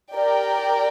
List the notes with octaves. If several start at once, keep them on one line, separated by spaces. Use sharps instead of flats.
G4 A#4 D5 G5